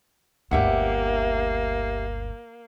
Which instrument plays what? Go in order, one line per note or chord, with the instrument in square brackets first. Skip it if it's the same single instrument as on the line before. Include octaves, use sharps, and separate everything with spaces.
[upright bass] G1 D2 [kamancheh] A#3 [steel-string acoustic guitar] G4 E5 F#5